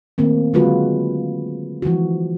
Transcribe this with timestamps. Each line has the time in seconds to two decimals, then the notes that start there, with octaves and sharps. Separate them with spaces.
0.18 D#3 A3 A#3 C4
0.53 D3 F#3 G#3 F4 F#4 B4
1.82 E3 F3 G#3 F#4